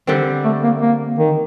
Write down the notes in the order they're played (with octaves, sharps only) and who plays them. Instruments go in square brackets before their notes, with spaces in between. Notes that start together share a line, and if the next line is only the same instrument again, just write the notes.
[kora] D3 G3 C4 [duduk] D#3
[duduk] A3
A#3
A#3
D#3